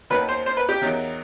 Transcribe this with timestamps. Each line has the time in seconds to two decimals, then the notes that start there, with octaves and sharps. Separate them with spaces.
0.10 D#2 D#3 F#3 B4
0.29 C5
0.46 C5
0.57 B4
0.69 G4
0.81 E2 D#3 F#3